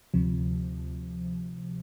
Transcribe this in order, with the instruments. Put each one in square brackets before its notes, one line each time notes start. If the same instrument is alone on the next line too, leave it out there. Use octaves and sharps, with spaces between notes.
[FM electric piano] D2 C3 F3